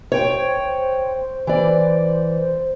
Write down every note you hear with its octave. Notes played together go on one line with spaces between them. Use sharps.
C5 C#5 G5
E3 D5